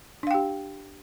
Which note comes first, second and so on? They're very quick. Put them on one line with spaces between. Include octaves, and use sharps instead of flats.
D4 F5 G5 G4